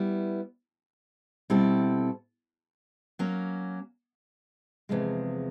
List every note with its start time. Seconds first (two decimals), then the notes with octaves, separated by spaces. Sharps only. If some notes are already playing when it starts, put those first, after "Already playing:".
Already playing: G3 B3 E4
1.50 B2 G3 C4 E4 A4
3.19 F#3 A#3 C#4
4.89 E2 C3 F3 G#3